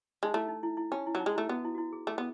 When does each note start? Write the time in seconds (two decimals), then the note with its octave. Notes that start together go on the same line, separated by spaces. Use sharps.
0.23 G#3 D#4
0.33 A3 E4
0.48 D#4
0.63 E4
0.77 E4
0.92 C#4 D#4
1.07 E4
1.15 F#3
1.20 D#4
1.26 G#3
1.36 A3 E4
1.49 B3 F#4
1.64 E4
1.75 F#4
1.78 E4
1.93 G#4
2.07 A3 G#4
2.18 B3